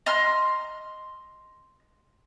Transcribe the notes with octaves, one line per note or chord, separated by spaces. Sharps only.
D#5 A#5 C6 F6